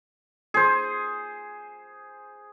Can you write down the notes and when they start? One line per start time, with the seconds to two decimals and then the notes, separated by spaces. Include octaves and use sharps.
0.54 G#4 C5